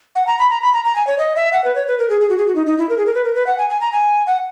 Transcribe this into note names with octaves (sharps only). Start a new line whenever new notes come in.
F#5
A#5
B5
A#5
B5
A#5
A#5
G#5
C#5
D#5
E5
F#5
B4
C#5
B4
A#4
G#4
G#4
F#4
G#4
F#4
D#4
D#4
E4
A#4
G#4
A#4
B4
A#4
B4
F#5
G#5
G#5
A#5
G#5
F#5